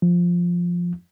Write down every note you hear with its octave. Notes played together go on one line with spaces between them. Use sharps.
F3